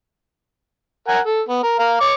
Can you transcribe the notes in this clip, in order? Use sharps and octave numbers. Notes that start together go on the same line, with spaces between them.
A#4 F#5 G#5
A4
B3
A#4
A#4 F5
C#5 C#6 D6